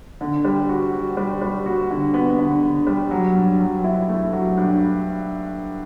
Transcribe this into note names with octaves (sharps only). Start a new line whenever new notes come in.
D3
G3
F#4
F#4
G3
G3
F#4
D3
B3
D3
D3
G3
F#3
G2
F#3
E4
A3
F#3
G2